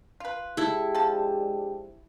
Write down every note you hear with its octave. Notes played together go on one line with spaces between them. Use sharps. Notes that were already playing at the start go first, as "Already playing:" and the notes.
F4 B4
G#3 D4 E4 G4 A4
F3 A5